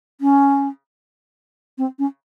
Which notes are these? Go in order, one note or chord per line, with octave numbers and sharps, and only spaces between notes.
C#4
C4
C#4